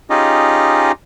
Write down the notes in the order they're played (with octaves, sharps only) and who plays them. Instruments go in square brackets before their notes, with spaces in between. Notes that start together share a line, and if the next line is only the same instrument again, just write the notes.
[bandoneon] C#4 D#4 F4 G4 G#4 D#5